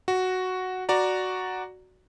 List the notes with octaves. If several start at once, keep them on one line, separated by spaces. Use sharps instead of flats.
F#4
F#4 D5 A#5